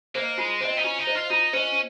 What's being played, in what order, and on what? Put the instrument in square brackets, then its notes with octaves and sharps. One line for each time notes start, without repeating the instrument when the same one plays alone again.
[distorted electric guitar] A#3 [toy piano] C5 D#5
[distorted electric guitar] G#3 [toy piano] F4
[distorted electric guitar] C4 [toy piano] C5 D#5
[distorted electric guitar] D#4
[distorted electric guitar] C#4 [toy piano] F4
[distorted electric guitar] D#4
[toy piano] C5 D#5
[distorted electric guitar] F4
[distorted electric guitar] D#4 [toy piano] F4
[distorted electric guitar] C#4 [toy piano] C5 D#5